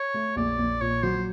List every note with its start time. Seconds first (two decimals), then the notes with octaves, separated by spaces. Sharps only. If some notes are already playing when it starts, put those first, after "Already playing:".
Already playing: C#5
0.14 A3
0.36 A#1 D5
0.58 A#1
0.81 A#2 C#5
1.03 F#3 C5